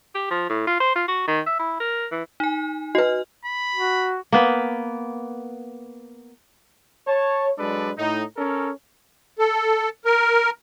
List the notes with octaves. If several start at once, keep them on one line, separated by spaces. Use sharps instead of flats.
G4
F3
A2
F4
C5
F4
F#4
D#3
E5
E4
A#4
E3
D#4 G#5
F#4 B4 D#5 F6
B5
F#4
A#3 B3 B4
C#5 A5
F#3 G#3 D4 A4 B4 D5
A2 D#4
C#4 A4 A#4
A4
A#4